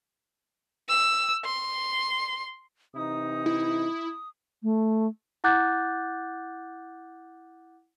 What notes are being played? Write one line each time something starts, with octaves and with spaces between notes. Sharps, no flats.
E6
C6
C3 E3 D#4 D#6
E4
A3
E4 F#5 D6 F#6 G6 A6